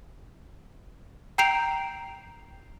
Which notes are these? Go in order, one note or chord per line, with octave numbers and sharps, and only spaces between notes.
G5 A#5 G6 C7 D7 F7